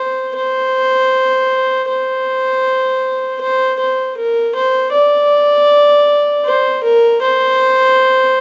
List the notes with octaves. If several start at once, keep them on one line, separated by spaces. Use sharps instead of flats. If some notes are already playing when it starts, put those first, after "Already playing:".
Already playing: C5
C5
C5
C5
C5
A#4
C5
D5
C5
A#4
C5